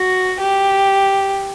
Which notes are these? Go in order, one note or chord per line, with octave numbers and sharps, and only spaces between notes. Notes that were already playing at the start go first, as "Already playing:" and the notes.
Already playing: F#4
G4